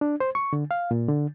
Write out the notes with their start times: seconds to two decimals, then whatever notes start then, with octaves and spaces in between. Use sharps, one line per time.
0.01 D4
0.20 C5
0.35 C#6
0.53 D3
0.71 F5
0.91 A#2
1.08 D3